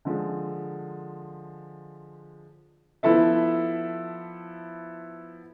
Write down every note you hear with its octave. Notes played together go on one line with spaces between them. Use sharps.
D3 F3 G#3
F3 B3 E4 A4 E5